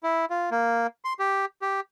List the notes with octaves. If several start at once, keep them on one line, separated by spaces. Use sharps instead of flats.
E4
F4
A#3
C6
G4
G4